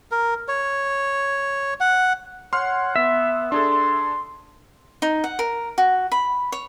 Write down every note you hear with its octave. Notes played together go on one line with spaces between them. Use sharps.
A#4
C#5
F#5
C#5 F#5 C6 F6
B3 E5
D4 G#4 A4 C6
D#4
F#5
A#4
F#4
B5
C#5